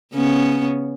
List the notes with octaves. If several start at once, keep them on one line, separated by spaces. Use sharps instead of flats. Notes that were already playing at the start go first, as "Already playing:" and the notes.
C#3 B3 C#4